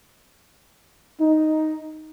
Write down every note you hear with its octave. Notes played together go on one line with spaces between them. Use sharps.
D#4